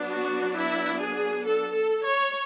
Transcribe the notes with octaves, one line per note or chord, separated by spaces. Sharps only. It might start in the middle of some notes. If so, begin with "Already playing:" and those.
Already playing: F#3 B3 D4
F#4
E4
G#4
A4
A4
C#5